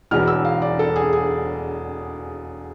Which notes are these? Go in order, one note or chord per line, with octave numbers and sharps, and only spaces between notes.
E1 E2 B2 F6
E6
F5
D5
A4
G#4
G#4